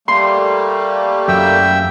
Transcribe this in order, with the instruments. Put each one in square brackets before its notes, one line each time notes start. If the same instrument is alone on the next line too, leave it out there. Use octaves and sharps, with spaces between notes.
[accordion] G3 A3 A#3 [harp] C6
[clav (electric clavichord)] F#2 [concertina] E5 G5